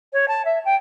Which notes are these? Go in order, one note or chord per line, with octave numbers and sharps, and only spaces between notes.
C#5
A5
E5
G5